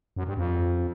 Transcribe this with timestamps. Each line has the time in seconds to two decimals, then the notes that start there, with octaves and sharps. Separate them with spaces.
0.16 F#2
0.27 G2
0.37 F2